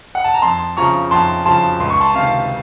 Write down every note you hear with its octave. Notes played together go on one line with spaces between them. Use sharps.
F#5
A5
A#5
F2 A5 C6
C#3 F3 A#5 C#6
F2 A5 C6
C#3 F3 A5 C6
C#2 C6
C#6
A5 C6
C3 D#3 F5 A5